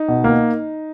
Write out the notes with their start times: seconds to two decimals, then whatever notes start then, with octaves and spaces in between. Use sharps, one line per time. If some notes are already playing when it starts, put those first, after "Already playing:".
Already playing: D#4
0.08 B2
0.24 A#3